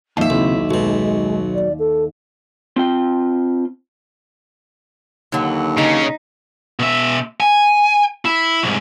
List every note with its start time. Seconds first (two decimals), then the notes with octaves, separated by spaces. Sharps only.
0.17 D#2 F3 E5 F5 A5
0.30 B1 C#3 C4 E4
0.71 B1 B2 F#3 G#3
1.54 D5
1.78 A4
2.76 C4 F4 G5
5.32 D#2 D3 F#3
5.78 C#3 C#4 D#4
6.79 B2 E5
7.40 G#5
8.25 E4
8.63 C2 G#2